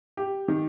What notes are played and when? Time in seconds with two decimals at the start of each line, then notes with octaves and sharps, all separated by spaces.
0.17 G4
0.48 D#3